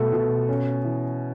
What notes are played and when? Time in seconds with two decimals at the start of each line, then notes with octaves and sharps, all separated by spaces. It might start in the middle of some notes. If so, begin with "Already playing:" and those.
Already playing: B2 A3 A4
0.13 B2
0.49 C#4
0.84 E3